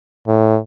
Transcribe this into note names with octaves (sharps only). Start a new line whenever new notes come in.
A2